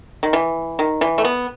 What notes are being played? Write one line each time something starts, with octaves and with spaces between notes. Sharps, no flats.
D#3
E3
D#3
E3
A3
B3